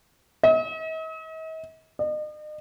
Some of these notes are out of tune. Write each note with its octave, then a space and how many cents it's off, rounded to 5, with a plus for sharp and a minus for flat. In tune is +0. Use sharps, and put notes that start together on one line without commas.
D#5 +45
D#5 -40